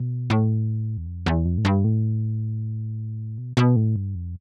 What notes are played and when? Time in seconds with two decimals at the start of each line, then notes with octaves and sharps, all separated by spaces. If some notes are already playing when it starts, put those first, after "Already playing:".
Already playing: B2
0.30 A2
0.97 E2
1.06 F2
1.26 E2
1.45 F2
1.58 A2
1.65 G2
1.84 A2
3.38 B2
3.57 B2
3.76 A2
3.96 G2
4.15 F2